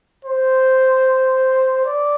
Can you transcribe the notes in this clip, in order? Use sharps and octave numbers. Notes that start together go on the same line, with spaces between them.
C5
D5